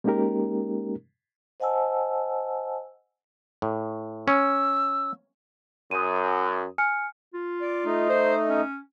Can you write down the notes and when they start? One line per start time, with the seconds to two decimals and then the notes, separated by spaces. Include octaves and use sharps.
0.04 G#3 A#3 C#4 D#4 G4 A#4
1.60 C5 D#5 F#5 G#5 A5 E6
3.62 A2
4.28 C#4 E6
5.91 F#2 D#6 D#7
6.78 G#5 F6 C#7
7.34 F4
7.61 D5
7.85 A3 D#4
8.09 C5
8.49 C#4